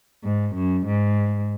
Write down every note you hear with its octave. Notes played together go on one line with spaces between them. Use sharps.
G#2
F#2
G#2